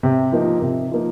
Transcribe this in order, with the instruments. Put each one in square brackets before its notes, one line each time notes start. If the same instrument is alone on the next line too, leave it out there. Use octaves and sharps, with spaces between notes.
[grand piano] C3
F3 A#3 D#4
C3
F3 A#3 D#4